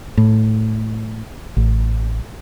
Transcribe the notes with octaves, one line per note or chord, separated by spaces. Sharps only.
A2
A1